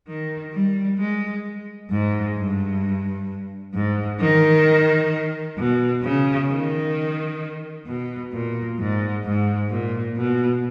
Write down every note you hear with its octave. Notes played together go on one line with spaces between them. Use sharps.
D#3
G3
G#3
G#2
G2
G#2
D#3
B2
C#3
D#3
B2
A#2
G#2
G#2
A#2
B2